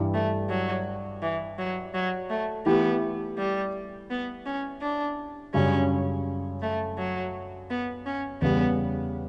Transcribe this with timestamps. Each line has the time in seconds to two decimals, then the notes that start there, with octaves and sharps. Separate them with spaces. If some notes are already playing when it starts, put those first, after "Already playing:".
Already playing: G2 E3 G3
0.14 A3
0.49 F#3
1.22 E3
1.58 F#3
1.94 F#3
2.30 A3
2.66 E3 A3 B3 E4 G4
3.38 G3
4.10 B3
4.46 C#4
4.81 D4
5.54 F#2 C#3 G3 C#4 D4
6.62 A3
6.98 F#3
7.70 B3
8.06 C#4
8.42 E2 C#3 G3 B3